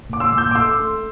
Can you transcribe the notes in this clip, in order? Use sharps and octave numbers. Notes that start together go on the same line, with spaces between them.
A#2 D6
C6 E6
A#2
E6 G6
D6
A3 C6 E6
A3